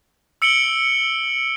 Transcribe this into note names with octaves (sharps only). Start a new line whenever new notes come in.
E6 C#7 D7 F#7 G7